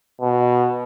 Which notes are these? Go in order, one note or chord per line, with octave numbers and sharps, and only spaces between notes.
B2